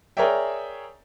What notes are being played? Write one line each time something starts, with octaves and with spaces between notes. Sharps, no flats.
G#4 A#4 C#5 D5 E5 G5